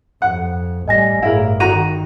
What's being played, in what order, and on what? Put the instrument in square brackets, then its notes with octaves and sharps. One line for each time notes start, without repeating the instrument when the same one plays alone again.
[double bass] F2 [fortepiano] F#5
[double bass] A1 G3 [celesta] D#5 G#5 A#6
[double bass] G1 A2 [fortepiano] E4 A#4 [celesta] G#4 F5
[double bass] D#3 [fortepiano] F#4 A#5 [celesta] D#7